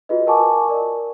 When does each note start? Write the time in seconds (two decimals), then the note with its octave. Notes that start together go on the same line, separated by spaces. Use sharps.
0.09 F4 F#4 G#4 B4 D#5
0.27 A#4 F#5 G#5 A5 C#6 D6
0.69 A#4 D5